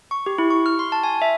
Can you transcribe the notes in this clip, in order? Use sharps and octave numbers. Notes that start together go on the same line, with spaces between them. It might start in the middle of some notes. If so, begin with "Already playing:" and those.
C#6
G4
E4
C#6
F6
C6
A5
G#5
E5